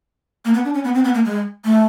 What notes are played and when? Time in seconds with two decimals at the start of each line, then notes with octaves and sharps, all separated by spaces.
0.45 A#3
0.54 B3
0.65 D4
0.74 C#4
0.84 B3
0.95 C4
1.04 B3
1.14 A#3
1.25 G#3
1.65 A3